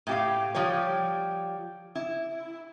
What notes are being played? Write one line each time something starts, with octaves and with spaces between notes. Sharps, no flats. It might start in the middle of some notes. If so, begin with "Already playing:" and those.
A2 G4 F5
F3 G3 G4 C#5
E4